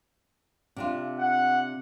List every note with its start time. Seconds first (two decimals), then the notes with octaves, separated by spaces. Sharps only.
0.76 C3 D4 F4
1.19 F#5